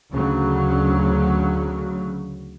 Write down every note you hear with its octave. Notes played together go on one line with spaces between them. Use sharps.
D2 C#3 F#3